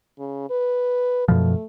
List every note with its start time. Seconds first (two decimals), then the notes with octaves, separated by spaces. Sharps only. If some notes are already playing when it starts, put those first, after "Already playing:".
0.19 C#3
0.50 B4
1.28 F#2 B2 F3 A3